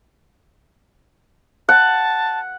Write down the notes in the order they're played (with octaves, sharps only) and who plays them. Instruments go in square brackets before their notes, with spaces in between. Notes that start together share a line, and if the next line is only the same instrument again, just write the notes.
[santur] F#5 [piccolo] A5